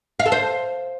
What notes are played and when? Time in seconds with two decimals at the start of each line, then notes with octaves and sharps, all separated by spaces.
0.19 F5
0.26 A4
0.32 C5